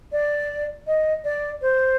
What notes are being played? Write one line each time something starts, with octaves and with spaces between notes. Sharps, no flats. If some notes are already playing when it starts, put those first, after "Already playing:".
D5
D#5
D5
C5